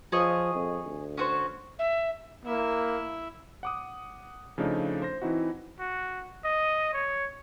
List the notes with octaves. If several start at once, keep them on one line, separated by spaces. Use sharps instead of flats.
F3 G#4 C#5 D#5
F2
D2
C#4 F#4 C5
E5
A#3 E4 E5
F#5 D6 D#6
C#3 F3 A3 D4 D#4
C5 A#6
E3 C4 D#4 E4 F#4
F#4
D#5
C#5